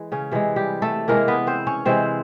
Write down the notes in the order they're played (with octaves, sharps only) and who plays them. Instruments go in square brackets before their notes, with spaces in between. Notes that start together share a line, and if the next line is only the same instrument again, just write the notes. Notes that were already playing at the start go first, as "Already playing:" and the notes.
Already playing: [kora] E3 G#3
C#3 C#4
C3 E3 G#3
G3 G4
A3 A4
C3 E3 G#3 A#3 A#4
B3 B4
C4 C5
C#4 C#5
C3 E3 G#3 C4 C5